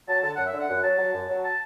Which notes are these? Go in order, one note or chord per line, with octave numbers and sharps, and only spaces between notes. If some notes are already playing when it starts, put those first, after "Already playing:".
F#3 A5
D3 A5
F#2 F#5
E5
D3 F#5
F#2
F#3 A5
F#3
F#2
F#3
A5